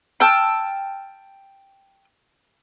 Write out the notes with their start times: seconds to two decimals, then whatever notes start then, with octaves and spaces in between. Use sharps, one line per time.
0.20 G5 A5 E6 F6